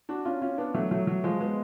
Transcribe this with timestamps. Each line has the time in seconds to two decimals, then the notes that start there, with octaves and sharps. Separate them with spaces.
0.09 D4 F#4
0.25 C#4 F4
0.41 C#4 F4
0.58 B3 D4
0.74 F#3 A3
0.91 F#3 A3
1.07 F#3
1.24 F3 G#3
1.41 G#3 B3